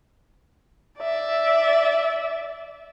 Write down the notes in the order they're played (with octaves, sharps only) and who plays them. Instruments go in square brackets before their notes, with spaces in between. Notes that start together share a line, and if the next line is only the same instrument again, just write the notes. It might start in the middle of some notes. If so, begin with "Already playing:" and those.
[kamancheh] D5 E5